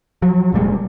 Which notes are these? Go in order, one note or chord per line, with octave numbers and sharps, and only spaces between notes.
F3 F#3
F1 A#2 G3 G#3